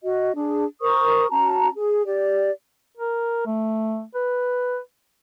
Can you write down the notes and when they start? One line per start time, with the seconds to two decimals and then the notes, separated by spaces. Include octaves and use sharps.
0.03 F#4 D#5
0.35 D4 G#4
0.81 A#4 C5 C#6 D#6
1.30 C#4 F#4 A5 A#5
1.76 G#4
2.06 G4 D5
2.97 A#4
3.46 A3
4.14 B4